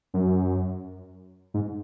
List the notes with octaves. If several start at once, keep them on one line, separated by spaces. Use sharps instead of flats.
F#2
G#2